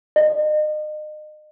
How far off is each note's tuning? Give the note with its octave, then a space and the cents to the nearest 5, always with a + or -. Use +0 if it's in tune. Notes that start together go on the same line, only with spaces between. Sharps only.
D#5 -35